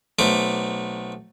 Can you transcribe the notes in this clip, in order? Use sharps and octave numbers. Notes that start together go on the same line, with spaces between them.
B1 A3 C4 D6